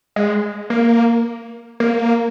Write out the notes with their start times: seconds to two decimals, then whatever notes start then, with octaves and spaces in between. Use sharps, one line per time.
0.16 G#3
0.70 A#3
1.80 A#3